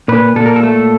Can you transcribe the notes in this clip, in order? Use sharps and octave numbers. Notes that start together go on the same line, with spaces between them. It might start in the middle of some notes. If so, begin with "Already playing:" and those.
A#2 B4
A#2 A4
A#4
A4
A3